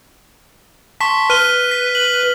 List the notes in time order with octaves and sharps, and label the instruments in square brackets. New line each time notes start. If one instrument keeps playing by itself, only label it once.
[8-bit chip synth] A5 C6 C#6 [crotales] B6
[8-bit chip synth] B4 [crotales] F6 D#7 G7
[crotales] B6
F#7